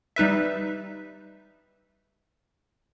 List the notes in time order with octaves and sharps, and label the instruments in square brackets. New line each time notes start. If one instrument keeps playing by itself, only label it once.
[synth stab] G3 D#4 B4 E5